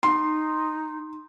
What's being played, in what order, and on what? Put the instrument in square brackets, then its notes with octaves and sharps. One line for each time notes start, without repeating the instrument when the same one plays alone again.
[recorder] D#4 [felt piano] C6